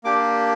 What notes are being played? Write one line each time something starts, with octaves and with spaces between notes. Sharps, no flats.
A#3 D4 G4 D6